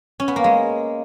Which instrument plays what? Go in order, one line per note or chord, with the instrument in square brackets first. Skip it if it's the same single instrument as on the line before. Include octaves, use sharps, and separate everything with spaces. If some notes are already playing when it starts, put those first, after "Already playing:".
[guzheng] C#4
B3
A#3
G#3